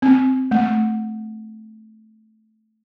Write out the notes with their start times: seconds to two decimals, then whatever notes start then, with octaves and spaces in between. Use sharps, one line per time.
0.02 C4
0.51 A3